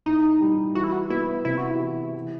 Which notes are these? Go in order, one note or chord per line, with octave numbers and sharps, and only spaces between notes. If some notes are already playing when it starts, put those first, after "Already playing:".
A2 D#4
G3
E3 F#4
E4
F#4
B3 E4
C3 E4
F#4
E4
E3
E3